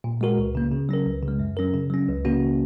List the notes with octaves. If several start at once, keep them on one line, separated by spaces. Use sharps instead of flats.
A#2
G#3 F#4 A#4
C#2
C#3 A#3
C#3
F#3 C#4 A#4
C#2
C#3
G#3
F#2
F#3 C#4 A#4
C#3
F#3 C#4
C#2
C#3 A#3 C#4 F#4